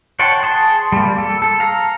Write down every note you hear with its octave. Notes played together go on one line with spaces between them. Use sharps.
C#5 F#5 G5 A5 C6
G#4 A5 C6
G3 A#3
A4
A4
F5 A#5